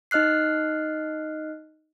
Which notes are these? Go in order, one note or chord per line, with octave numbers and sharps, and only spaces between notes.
D#4 D#5 F6 F#6 C7